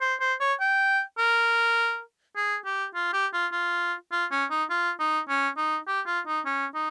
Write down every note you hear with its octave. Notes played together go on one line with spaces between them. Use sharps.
C5
C5
C#5
G5
A#4
G#4
G4
F4
G4
F4
F4
F4
C#4
D#4
F4
D#4
C#4
D#4
G4
F4
D#4
C#4
D#4